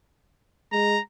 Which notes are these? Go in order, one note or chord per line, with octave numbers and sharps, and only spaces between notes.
G#3 A#5